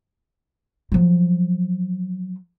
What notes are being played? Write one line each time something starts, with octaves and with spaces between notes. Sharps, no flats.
F3 F#3